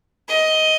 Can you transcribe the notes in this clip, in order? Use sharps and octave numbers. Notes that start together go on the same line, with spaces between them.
D#5